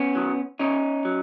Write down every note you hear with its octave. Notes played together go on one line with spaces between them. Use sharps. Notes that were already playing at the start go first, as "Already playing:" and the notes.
Already playing: B3 C#4
D#3 F#3
C#3 C#4 D#4
F#3